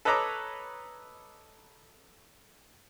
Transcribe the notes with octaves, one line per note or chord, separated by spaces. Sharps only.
A4 B4 C#5 D#5 A#5 D6